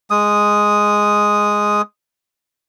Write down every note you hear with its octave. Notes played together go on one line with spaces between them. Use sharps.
G#3 D#6